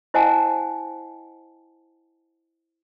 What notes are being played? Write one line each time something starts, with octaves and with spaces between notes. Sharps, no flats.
E4 C5 D#5 F#5 G#5 A5